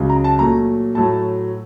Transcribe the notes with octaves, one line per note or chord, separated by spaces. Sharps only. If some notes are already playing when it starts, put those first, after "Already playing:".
Already playing: C#2 C#3 F#3
A#5
A5
A#2 F#3 A3 A#5
A2 F#3 A3 A5